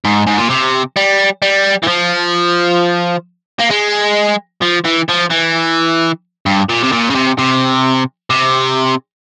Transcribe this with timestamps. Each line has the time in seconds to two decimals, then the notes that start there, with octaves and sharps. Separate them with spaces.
0.05 G#2
0.27 G#2
0.38 A#2
0.50 C3
0.97 G3
1.42 G3
1.83 E3
1.87 F3
3.60 A#3
3.71 G#3
4.62 F3
4.85 E3
5.09 F3
5.31 E3
6.46 G2
6.69 A#2
6.84 C3
6.92 A#2
7.10 C#3
7.15 C3
7.39 C3
8.30 C3